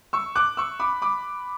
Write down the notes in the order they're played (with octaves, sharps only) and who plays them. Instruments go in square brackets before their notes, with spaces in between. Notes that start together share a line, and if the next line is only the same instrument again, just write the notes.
[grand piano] C#6 E6
D6 F#6
C#6 E6
B5 D6
B5 D6